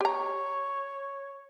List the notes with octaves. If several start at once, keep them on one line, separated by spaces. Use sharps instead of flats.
G4 C#5 A#5